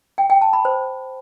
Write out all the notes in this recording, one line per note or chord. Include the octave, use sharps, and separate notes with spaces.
G5
G5
A5
B5
C5